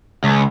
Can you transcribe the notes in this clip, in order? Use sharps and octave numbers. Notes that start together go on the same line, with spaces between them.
C#2